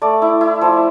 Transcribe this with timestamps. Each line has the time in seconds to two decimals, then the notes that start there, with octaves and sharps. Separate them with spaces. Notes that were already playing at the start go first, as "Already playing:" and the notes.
0.02 A3 D5
0.22 E4
0.41 E4
0.61 F3